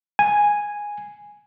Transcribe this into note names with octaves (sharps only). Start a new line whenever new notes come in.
G#5